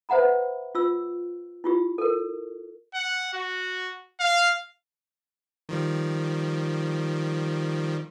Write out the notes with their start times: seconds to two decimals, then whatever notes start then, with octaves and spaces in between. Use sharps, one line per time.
0.09 B4 C5 E5 F#5 A#5 B5
0.75 F4 E6
1.64 E4 F4 G4
1.98 A4 A#4
2.95 F#5
3.34 F#4
4.20 F5
5.69 D#3 F3 G3